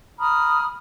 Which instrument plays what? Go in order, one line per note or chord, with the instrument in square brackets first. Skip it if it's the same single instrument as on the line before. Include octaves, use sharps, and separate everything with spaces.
[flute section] A#5 B5 D#6 F6